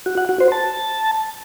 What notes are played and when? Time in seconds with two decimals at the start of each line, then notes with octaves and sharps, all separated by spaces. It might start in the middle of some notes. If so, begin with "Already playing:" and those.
0.06 F#4
0.18 F#5
0.29 F#4
0.40 C5
0.52 A5